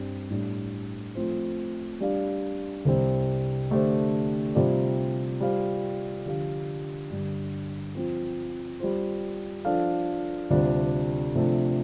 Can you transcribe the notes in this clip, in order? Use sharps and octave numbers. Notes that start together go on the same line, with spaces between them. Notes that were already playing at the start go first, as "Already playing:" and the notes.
Already playing: G2 G3 C4
A2 G3 D4
F3 A3 C4 F4 C5
G3 D4 G4 D5 F5
C2 C3 G3 C4
D3 A3 D4 G4 C5
C3 G3 F4 D5
G3 F4 C5 F5
D3 F3 D4 G4 F5
G2 D3 G3
F3 C4 F4
G3 F4 C5
F3 D4 A4 F5
D2 C3 G3 D4 F4
C3 F3 A3 D4 A4